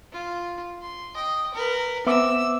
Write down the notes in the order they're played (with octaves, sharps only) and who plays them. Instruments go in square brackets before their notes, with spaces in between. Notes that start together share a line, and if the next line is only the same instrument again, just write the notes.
[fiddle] F4
C6
D#5 G5
A#4 B4
[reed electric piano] B3 E5 D6 [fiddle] C4 E6